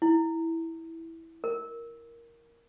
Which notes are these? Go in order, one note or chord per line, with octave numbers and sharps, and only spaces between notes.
E4
A#4